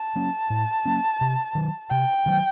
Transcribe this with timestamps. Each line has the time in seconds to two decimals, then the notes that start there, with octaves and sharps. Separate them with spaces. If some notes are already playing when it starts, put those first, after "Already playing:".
Already playing: A5
0.16 F#3 A#3 C#4
0.50 A2
0.85 F#3 A#3 C#4
1.21 C3
1.55 D#3 F#3
1.90 C3 G5
2.26 D#3 F#3